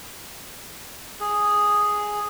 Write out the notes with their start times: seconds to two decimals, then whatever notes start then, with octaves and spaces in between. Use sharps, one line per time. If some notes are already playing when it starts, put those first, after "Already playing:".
1.20 G#4